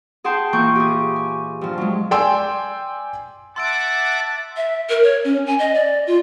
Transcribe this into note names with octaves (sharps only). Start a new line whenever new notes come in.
G#4 F#5 G5 A5 C6 G6
A#2 E3 A#3 C#6 G6
G4 G#4
G#5
G2 F3
F#3 G#3
D5 G5 G#5 C6 E6
E5 F#5 A5 C6 D6 E6 D7
E5
A#4
C#5
C#4
G#5
D#5
D5
F4